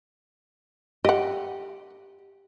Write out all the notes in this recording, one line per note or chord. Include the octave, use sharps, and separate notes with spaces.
G4 D#5 F#5